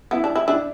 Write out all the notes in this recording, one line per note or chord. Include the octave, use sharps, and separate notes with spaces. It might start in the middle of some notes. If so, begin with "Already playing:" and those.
B3 E4
D4
E4
D4 E4